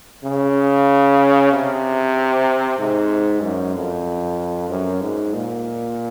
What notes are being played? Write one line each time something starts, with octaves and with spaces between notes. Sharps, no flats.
C#3
C3
G#2
F#2
F2
F#2
G#2
A#2